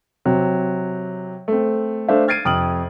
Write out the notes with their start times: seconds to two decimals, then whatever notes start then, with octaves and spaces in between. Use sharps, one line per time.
0.25 C3 F#3 C4
1.48 A3 C4
2.08 A3 D4 C5 E5 F5
2.28 F6 G#6 A6 C7 D7 D#7
2.45 F2 C3 D#6 F6 D7 F#7